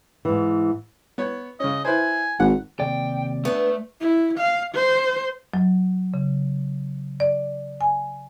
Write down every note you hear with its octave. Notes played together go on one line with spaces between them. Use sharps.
G#2 E3
B3 C#5
C#3 C#4 D#5
E4 B4 C5 G#5
G#1 F#5
D#2 C3 D5 G5
A3 B3 D4
E4
F5
C5
F#3
C#3
D5
G#5